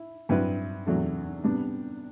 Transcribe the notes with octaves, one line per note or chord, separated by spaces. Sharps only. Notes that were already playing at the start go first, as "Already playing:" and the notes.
Already playing: E4
G2 F#3 C4 E4 B4
E2 C3 F#3 A3
C3 G3 B3 D4